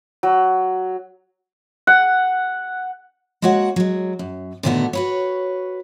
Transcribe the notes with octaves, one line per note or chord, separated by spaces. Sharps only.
F#3
F#5
G#3 A#3 F#4 C#5 F#5
F#3 G#3
F#2
A#2 D3 D#3 A3 B3 F#4
F#4 B4 C#5